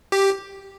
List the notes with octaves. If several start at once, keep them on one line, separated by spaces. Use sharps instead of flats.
G4